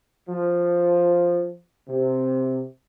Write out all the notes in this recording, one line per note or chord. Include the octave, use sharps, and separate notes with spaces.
F3
C3